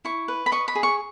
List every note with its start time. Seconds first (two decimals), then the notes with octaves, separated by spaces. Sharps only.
0.05 E4 C#6
0.28 B4
0.46 B5
0.52 D#5 C#6
0.68 B5
0.75 G#4
0.83 C#6